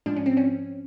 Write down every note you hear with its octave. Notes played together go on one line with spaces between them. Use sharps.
G#2 F3 D4
C#4
C4
C#4